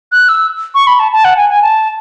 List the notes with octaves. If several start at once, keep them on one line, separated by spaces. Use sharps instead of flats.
F#6
E6
C#6
B5
A5
A5
F#5
G#5
G#5
A5